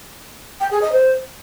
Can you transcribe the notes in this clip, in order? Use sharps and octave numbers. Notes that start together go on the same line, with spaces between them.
G5
G#4
D#5
C5